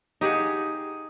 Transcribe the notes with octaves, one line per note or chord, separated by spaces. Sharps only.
D#4 G4 G#4 F#5